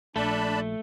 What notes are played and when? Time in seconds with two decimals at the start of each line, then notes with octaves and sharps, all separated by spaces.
0.16 A#1 A3 D4 A5 B5